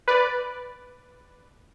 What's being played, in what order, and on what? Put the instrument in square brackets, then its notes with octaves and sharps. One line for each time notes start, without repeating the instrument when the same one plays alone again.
[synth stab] B4 D5